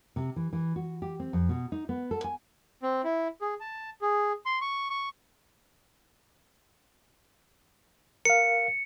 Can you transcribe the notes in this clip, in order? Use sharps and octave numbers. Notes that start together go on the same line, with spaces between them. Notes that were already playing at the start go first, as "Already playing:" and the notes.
C3
E3
E3
F#4
G4
C4
F2
B2
D#4
B3
A4
G#5
C4
E4
G#4
A5
G#4
C6
C#6
C#6
A#4 F5 C#7